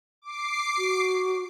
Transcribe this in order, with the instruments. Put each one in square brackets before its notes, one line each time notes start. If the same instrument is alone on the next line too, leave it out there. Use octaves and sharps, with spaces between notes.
[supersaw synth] D6 C7
[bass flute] F#4